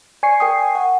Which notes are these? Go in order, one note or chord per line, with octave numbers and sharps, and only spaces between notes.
D5 G#5 C#6 C7
A#4 G5 D#6
F#5